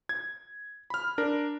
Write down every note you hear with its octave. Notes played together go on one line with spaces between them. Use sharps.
G#6
B5 F6
D4 A#4